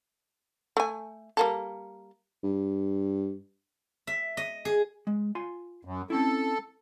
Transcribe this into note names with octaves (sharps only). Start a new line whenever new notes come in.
A3 G#5
G3 A#3 A4
G2
E5
D#5
G#4
G#3
F4 G#5 C6
F#2
C4 C#4 E4 A4